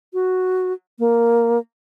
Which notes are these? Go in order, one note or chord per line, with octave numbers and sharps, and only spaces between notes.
F#4
A#3